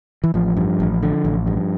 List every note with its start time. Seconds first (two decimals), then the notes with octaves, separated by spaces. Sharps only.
0.24 E3
0.34 A1 F3
0.57 G2
0.80 A1
1.03 D3
1.25 A1
1.47 G2